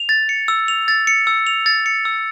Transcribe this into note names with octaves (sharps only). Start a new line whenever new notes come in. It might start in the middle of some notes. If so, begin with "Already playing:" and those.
Already playing: F7
A6
C#7
E6
F7
A6
C#7
E6
F7
A6
C#7
E6